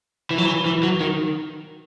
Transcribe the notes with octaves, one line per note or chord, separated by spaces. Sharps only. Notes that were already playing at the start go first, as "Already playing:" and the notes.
E3
F#3
E3
E3
F#3
D#3